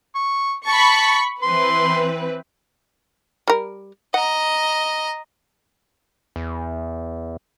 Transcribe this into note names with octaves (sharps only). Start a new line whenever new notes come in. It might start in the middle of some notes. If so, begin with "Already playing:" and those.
C#6
A5 B5 C#6
E3 C4 B4 C6
G3 A#4
D#5 F#5 A#5
E2